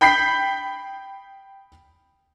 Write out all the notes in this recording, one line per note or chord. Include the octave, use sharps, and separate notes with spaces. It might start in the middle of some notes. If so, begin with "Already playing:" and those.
G5 B5 G6 B6 C7